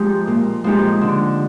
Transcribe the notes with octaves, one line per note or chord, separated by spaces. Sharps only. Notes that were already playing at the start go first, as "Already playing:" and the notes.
Already playing: F3 G#3 D#4 G4
A#2
F3 G#3 D#4 G4
D3